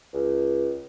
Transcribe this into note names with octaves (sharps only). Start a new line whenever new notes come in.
C#2